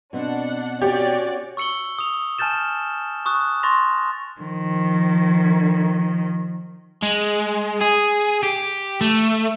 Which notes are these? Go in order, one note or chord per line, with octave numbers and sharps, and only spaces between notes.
B2 C4 D4 F#5
C#4 F#4 G4 C#5 D5
C#6 E6 C#7 F#7 G7
D#6 F7
G#5 A5 F6 G6 A6 E7
C#6 D#6 F#6
C6 C#6 A6 A#6 F7
D#3 F3
G#3
G#4
G4
A3